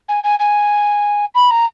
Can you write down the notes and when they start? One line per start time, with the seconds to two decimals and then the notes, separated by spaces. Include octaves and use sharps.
0.08 G#5
0.23 G#5
0.39 G#5
1.34 B5
1.50 A#5